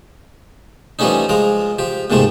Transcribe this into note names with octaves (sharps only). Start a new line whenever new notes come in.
E3 F3 G3 A3 C#4 D#4
F3 G#3 A#4
F3 G4
D#2 G#2 C3 F3 A3